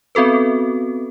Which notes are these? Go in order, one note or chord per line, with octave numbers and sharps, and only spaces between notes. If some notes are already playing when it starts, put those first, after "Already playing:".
B3 C4 F#4 A4 B4